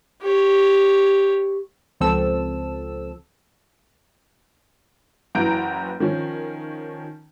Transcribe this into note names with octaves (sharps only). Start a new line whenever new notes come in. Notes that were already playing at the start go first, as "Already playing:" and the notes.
G4 C#5
C#2 F3 C4 A4 E6
F#1 E3 F#4 A#5 G6 D7
D#3 F3 C#4